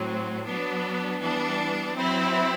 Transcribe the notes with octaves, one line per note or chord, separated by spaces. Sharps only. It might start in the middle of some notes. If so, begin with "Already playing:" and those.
Already playing: A2 F#3 C4
F#3 B3 D4
E3 G3 B3 D4
F#3 C4 E4